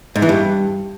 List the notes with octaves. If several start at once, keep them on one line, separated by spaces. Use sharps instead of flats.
G#2
E3
G2